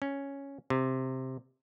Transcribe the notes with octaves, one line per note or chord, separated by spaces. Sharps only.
C#4
C3